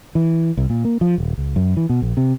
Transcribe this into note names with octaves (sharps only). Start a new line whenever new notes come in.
E3
C2
A#2
A#3
F3
D#1
C#2
F#2
E3
B2
A#1
C3